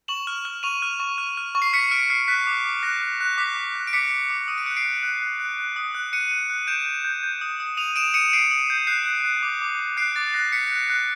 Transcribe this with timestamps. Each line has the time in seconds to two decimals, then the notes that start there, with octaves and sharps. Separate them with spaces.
0.08 C#6 E7 F#7
0.27 F6
0.45 F6
0.63 C#6 D#7 F7
0.82 F6
1.00 C#6
1.18 F6
1.37 F6
1.55 C#6
1.62 C7
1.73 F6 B6 C#7
1.91 F6 C7 D7
2.10 F6 C7
2.28 F#6 B6
2.47 D6
2.65 D6
2.83 F#6 A#6
3.02 F#6
3.21 F#6
3.38 D6 B6
3.57 D6
3.75 F#6
3.87 D7
3.93 D6 B6 C#7
4.12 D6
4.30 D6
4.48 D#6 D#7
4.58 D7
4.66 F#6 C#7
4.76 C7 D7
4.84 F#6
5.03 F#6
5.22 F#6
5.40 F#6
5.59 F#6
5.76 D#6
5.95 F#6
6.13 F#6 C#7 D#7
6.31 F#6
6.50 F#6
6.67 G6 D7 E7
6.86 G6
7.04 G6
7.23 G6
7.41 D#6
7.60 D#6
7.77 D#6 D#7 F7
7.96 D#6 D7 E7
8.14 D#6 C#7 D#7
8.33 D#6 C7 D7
8.51 D#6
8.70 G6
8.87 F#6 C7
9.06 F#6
9.24 F#6
9.43 D6
9.62 D6
9.80 D6
9.97 F#6 C7 D7
10.16 D6 A6
10.34 F#6 A#6
10.52 F#6 B6 C#7
10.71 F#6
10.90 F#6